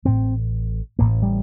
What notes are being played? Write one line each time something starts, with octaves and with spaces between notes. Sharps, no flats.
A1 A2 C4
A1 A2 A#3
G3